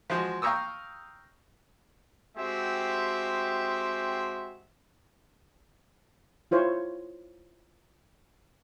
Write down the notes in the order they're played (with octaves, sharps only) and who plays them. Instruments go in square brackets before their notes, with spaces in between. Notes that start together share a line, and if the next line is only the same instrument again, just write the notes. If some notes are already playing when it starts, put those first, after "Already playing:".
[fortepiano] F3 G#3 F#4 D#5
F5 G5 A#5 C#6 D#6 E6
[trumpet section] G#3 C4 F#4 G4 E5
[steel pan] E4 F4 C5 C#5